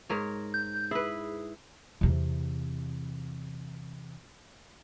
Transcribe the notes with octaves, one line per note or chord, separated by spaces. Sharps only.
G#2 A#4 C#5
G6
E4 G#4 B4
E2 C3